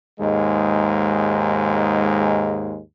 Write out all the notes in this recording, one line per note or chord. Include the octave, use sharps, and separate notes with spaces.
D#2 G#2 G#3